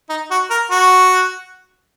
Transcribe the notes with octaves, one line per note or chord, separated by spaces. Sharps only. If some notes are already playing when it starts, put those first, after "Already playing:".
D#4
F#4
A#4
F#4